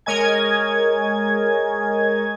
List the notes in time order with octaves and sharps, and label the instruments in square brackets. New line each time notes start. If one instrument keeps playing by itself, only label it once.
[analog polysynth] G#3 A#4 C#5 D#5 G#5 G#6